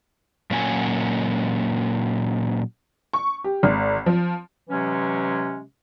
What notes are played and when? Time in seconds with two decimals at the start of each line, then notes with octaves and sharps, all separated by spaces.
0.51 A#2 F#3 A#3 C#4 F#4 G#5
3.13 C#6
3.44 G4
3.63 G#1
4.06 F3
4.69 C3 E3 F#3 G#3 C#4